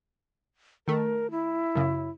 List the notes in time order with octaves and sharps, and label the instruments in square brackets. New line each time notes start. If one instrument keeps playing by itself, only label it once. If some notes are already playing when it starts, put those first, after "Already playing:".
[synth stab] D#3 A3 [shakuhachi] A#4
[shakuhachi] E4
[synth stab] F#2 C#3